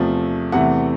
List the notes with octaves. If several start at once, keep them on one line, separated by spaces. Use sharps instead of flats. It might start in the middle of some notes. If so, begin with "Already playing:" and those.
Already playing: E2 C3 F3 A3
E2 C3 E3 A3 F#5